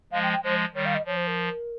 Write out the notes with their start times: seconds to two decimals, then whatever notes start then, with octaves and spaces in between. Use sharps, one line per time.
0.12 F3 G#3 F5
0.23 G5
0.33 G5
0.43 F3 G#3 C5
0.74 D#3 G3 C#5
0.86 F5
0.95 D#5
1.06 F3 C#5
1.17 C5
1.27 A#4